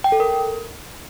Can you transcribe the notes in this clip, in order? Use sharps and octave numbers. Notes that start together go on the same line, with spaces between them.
G5
A4
A#4